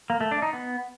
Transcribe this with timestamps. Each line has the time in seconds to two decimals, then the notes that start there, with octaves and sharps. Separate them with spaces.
0.10 A#3
0.21 A3
0.31 D4
0.42 D#4
0.53 B3